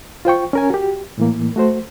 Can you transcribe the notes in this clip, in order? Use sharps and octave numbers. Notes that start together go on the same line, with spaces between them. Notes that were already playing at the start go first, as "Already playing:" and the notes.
F4 C5 G5 C#6
C#4 A#4 G#5
F#4 G4
A2 E3 A#3
A3 F#4 C5